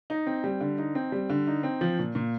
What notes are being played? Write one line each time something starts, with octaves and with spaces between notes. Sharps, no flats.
D#4
C4
G3
D3
D#4
C4
G3
D3
D#4
C4
F3
A#2
A#2